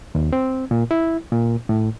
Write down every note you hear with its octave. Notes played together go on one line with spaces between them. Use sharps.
D#2
C4
A#2
E4
A#2
A2